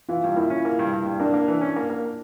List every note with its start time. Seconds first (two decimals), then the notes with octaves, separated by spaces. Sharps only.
0.08 E3 F4
0.24 G2
0.36 A#3 E4
0.50 C#4
0.65 A#3
0.79 G2
0.93 G2
1.06 G2
1.20 A#3 D4
1.34 A#3
1.48 E3
1.61 C#4
1.76 A#3
1.90 A#3